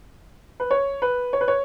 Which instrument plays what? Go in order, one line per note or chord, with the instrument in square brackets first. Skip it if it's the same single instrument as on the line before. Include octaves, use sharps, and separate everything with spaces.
[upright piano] B4
C#5
B4
C#5
B4
C#5